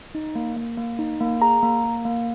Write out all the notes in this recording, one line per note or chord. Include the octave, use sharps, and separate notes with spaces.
D#4
A#3
A#3
A#3
D#4
A#3
G#4 A#5
A#3
A#3
A#3